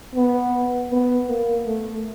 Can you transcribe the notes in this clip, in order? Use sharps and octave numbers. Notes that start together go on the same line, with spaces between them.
B3
B3
A#3
A3